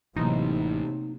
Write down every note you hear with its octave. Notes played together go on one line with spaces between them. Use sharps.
A1 C3 E3 F#3 A#3 D#4 C6